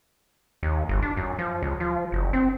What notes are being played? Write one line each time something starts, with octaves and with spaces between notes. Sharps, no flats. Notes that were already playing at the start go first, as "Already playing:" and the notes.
D#2
G1
D4
F#2
F3
C#2
F3
F#1
C4